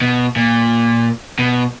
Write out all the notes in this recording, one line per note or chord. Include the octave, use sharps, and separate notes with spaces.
B2
A#2
B2